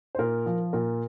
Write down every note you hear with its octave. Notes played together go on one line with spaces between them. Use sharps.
C5
A#2 A#4
F3
A#2 A#4